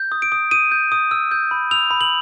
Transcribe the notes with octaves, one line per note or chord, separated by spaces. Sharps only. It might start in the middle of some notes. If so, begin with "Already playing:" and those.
Already playing: G6
D#6
D7
D#6
D#6 D#7
G6
D#6
E6
G6
B5
E6 F7
B5
F#7